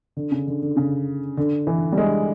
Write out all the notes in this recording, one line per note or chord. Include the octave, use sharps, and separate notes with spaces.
D3
C#3
D3
D3
C#3
D3
E3
G3
G#3